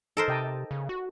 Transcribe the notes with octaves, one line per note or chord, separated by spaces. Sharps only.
D#4 A4 A#4 C5 D#5
C3 D#5 G5 A5
C#3
F#4